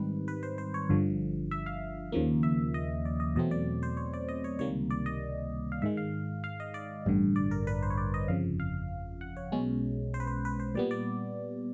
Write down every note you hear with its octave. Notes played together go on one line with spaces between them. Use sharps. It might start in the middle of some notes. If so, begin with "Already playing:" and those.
Already playing: G#2 D#3 G3 C4 D#4 B4
B4
C5
C5
C#5
G1 G2 D3 F3
E5
F5
D#2 C#3 F3 A#3
E5
D#5
D5
D#5
E2 B2 F#3 A3 C4 D#5
D5
C5
C#5
D5
D#5
C#5
C#2 C3 D#3 G3 A#3 C#5
D5
D#5
F5
G#2 D#3 G#3 E5
F5
F5
D#5
D5
A1 G2 D3
D5
A#4
B4
C5
C#5
D5
D#5
G1 F2 C#3 F3 F5
F5
F#5
C#5
B1 B2 G#3 C#4
C5
B4
C5
B4
C5
A#2 G3 B3 D5
D5